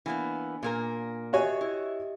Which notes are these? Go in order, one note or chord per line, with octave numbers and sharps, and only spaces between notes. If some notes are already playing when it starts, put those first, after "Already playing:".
E3 A#3 B3 D4 G#5
A#2 A#3 A#4
F#4 G4 C#5 D#5 E5 G#5
E4